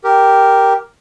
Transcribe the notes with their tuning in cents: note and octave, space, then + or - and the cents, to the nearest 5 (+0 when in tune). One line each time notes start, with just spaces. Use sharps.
G4 +0 A#4 +0